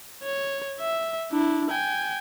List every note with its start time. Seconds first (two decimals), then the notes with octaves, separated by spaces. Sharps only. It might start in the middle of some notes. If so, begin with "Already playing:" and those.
0.23 C#5
0.80 E5
1.32 D4 E4
1.70 G5 G#5